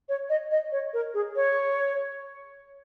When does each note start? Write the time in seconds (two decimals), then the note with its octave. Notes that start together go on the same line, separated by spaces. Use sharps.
0.09 C#5
0.30 D#5
0.51 D#5
0.72 C#5
0.94 A#4
1.14 G#4
1.36 C#5